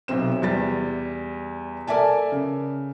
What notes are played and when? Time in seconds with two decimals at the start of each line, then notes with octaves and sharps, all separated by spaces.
0.08 B1 C3 C4 E7
0.42 E2 G3 A6
1.87 A4 A#4 D5 E5 G#5 A5
2.32 C#3